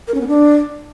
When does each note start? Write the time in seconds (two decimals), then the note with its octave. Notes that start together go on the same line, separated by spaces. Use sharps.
0.08 A#4
0.14 C#4
0.21 B3
0.27 D4